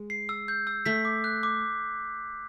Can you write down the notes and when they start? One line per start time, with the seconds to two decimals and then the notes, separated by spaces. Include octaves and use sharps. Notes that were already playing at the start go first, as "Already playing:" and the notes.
Already playing: G#3
0.10 C7
0.29 E6
0.48 G6
0.67 E6
0.86 A3 B6
1.05 D6
1.24 F#6
1.43 D6